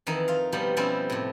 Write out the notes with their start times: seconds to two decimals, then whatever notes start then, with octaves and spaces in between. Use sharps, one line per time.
0.07 F2 D#3 E3 D#4
0.28 F4 F5
0.52 B2 F3 G3 B3 G4
0.77 B2 F3 G3 C4 C#4 E4
1.10 A2 C3